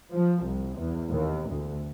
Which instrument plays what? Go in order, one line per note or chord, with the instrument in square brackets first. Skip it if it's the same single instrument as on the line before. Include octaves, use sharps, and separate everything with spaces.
[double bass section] F3
C2
E2
D#2
D2